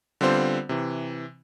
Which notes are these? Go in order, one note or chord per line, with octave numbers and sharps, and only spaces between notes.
D3 G3 B3 C4 F4 C5
C3 E3